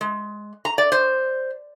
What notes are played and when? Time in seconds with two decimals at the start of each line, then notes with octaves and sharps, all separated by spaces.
0.01 G#3
0.65 A#5
0.78 D5
0.92 C5